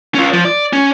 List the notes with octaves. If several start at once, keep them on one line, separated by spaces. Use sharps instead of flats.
C#4 F4
F3
D5
C#4